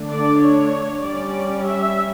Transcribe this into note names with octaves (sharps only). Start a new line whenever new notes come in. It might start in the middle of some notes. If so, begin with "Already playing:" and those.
Already playing: D3 A3 D4
D5
C#5
G3 C#4 D5
E5